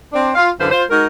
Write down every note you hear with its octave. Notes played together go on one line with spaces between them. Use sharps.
C4 D4
F4 F5
F#2 D3 E3 B4 C5 F5
F4 C5
G#3 D#4 F#4 A#4